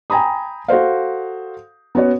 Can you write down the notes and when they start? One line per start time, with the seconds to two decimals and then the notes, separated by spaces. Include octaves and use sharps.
0.10 G5 G#5 A#5 B5 D#6
0.68 F#4 A4 C5 F5
1.95 B3 C#4 F#4 C#5